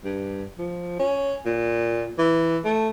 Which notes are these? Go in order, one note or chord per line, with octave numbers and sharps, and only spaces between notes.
G2
F3
C#4
A#2
E3
A3